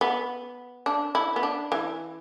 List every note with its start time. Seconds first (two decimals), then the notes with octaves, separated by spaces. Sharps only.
0.01 B3
0.86 D4
1.15 E4
1.36 B3
1.43 D4
1.72 E3